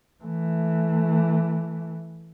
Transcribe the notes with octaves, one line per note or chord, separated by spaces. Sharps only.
E3 A3